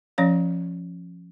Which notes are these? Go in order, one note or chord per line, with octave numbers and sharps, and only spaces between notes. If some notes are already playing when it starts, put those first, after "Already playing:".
F3 C#4 C#5 F5